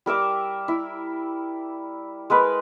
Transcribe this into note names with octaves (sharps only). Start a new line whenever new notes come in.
G3 A#4 E5 D6
E4
G#3 A#4 B4 B5